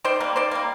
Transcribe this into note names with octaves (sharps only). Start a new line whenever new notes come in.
D#3 C5 D5
G3 A#3
D#3 C5 D5
G3 A#3